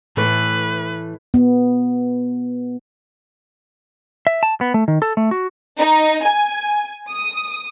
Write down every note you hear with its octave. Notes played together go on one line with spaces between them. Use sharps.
A2 E3 A3 B4
B3
E5
A5
B3
A3
D#3
A4
A3
F#4
D#4
G#5
D#6